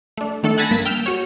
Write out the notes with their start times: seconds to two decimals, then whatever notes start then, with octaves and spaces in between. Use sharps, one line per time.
0.18 A3 D4
0.43 D#3 A3 D4 A4
0.58 F#5 G#5 A5 B5 A6 A#6
0.71 G2 A#3 B6
0.85 G5 E6 F6
1.06 F#4 C#5